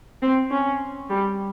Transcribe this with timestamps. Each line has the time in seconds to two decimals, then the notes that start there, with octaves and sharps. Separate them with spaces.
0.22 C4
0.51 C#4
1.09 G3